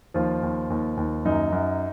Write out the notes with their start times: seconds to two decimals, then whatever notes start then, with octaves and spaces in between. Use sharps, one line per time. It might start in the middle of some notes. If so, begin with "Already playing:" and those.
0.14 D#2 F3 F4
0.43 D#2
0.70 D#2
0.97 D#2
1.25 F#2 D#4
1.52 F#2